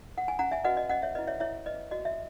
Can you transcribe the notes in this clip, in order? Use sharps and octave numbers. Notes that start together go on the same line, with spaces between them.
F#5
G#5
C#4 F#5 A#5
E5 G#5
F#4 B4 D#5 F#5
D#5
C#4 D#5 F#5
C#5 E5
E4 B4 D#5
C#5 E5
E4 C#5 E5
B4 D#5
F#4 D#5
E5